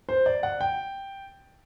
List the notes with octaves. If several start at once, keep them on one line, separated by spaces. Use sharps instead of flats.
C5
D5
F#5
G5